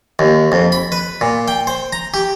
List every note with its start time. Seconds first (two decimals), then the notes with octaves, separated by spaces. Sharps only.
0.19 D#2
0.52 F2
0.72 B5
0.92 B4
1.21 A#2
1.48 G5
1.67 C5
1.93 A#5
2.14 G4